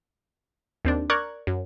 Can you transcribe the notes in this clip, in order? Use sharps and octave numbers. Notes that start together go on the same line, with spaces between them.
D#2 C4 D4
A#4 D5 C#6 F#6 G#6
F#2